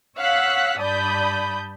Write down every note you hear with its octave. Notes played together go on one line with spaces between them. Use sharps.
C#5 F5 F#5 E6 F#6 B6
G2 D5 A5 B5 D#6 G6